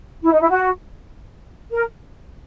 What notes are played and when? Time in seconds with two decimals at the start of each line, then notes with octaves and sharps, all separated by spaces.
0.23 E4
0.32 D#4
0.40 E4
0.50 F#4
1.71 A#4